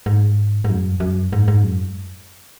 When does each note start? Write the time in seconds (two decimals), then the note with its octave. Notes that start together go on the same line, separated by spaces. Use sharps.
0.06 G#2
0.64 G#2
0.69 F#2
1.00 F#2
1.33 G#2
1.48 G#2
1.64 F#2